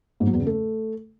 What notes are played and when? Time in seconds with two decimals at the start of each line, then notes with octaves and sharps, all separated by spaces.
0.20 G#2
0.27 F#3
0.33 E2
0.40 C#3
0.46 A3